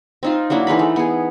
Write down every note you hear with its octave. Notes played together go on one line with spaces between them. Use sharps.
C4 D#4 F4
F#3 A#3 D4 E4
E3 G#3 D#4 B5
A3
B3 G#4